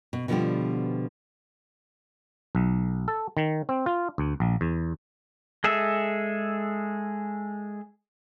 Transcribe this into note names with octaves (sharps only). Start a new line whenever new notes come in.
B2
B2 D3 F3 G3 B3 G4
B1
A4
D#3
C4
F4
D2
A#1
E2
G#3 G#4 A4 E5